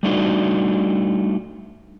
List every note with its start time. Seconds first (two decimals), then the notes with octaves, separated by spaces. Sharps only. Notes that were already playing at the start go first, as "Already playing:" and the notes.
0.03 G3 A3 D4 D#4 F#4